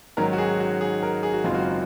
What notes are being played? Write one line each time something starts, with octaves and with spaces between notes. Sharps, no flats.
G#2 D#3 F#3 C#4 A#4
F#4
G#4
F#4
G#4
A#4
G#4
F#4
F#1 F#2 D#3 G#3 C4 F4
F#4